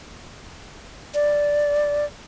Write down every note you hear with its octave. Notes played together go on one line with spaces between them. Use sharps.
D5